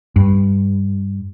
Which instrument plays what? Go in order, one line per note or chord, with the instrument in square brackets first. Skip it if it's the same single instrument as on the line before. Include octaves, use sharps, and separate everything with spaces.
[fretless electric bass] G2